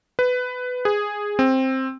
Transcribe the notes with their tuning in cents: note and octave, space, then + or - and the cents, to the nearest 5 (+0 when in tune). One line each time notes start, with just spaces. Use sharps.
B4 +15
G#4 -5
C4 +10